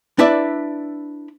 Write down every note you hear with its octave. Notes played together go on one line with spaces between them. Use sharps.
D4 E4 B4 D5 E5